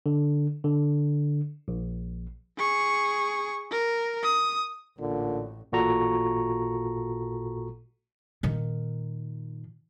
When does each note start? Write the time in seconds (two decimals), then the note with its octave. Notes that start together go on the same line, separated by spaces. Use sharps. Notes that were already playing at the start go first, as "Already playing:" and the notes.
0.06 D3
0.64 D3
1.68 A#1
2.58 G#4 C#6
3.72 A#4
4.23 D#6
4.99 A1 A#2 D3
5.72 A1 A#2 F#4 A4 A#5 C#6
8.43 A#2 D#3